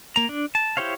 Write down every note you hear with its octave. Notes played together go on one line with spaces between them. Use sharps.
A#3 A#5
D4
A5
E4 G4 C5 C#5 F5